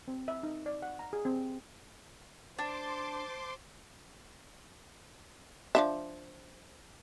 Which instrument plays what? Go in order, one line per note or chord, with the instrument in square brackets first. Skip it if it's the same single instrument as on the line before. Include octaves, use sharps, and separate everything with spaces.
[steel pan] C4
E5
D#4
D5
F#5
A#5
G#4
C4
[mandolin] D4 [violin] C5 [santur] A5 [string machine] C6 D6
[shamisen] F3 D4 E5